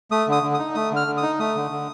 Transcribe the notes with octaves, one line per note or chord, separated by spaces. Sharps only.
A3 D#6
D3 D#6
D3
D#6
D#4
A3 D#6
D3 F6
D3
D#6
D#4
A3 D#6
D3
D3